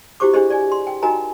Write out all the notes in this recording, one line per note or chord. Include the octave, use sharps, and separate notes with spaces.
E4 F#4 G4 C5 C#6 D6
D4 E4 G4 G#4 C5 D#5
D5 G#5
C6
G5
D#4 F#4 A#4 D#5 G#5 A#5